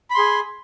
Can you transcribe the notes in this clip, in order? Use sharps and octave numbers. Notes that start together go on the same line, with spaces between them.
G#4 B5 C6